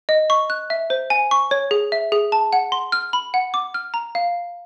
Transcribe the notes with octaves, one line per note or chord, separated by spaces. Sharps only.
D#5
C#6
F#6
E5
C5
G#5
C#6
C#5
G#4
E5
G#4
A5
F#5
C6
F6
B5
F#5
D6
F6
A#5
F5